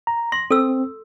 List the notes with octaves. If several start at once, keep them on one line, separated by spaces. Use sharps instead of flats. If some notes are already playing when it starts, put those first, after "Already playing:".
A#5
C6 A#6
C4 A4 E6